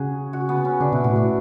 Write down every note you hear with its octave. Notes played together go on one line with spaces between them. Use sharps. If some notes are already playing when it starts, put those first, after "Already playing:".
Already playing: C#3 F#4 G#4
F#4
B3
C#4
C#3 D4
B2 E4
A2 F#4
A2 D4